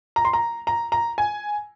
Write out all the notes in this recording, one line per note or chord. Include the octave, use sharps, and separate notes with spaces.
A#5
C6
A#5
A#5
A#5
G#5